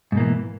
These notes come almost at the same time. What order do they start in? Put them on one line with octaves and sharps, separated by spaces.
G#2 B2 A#3 E3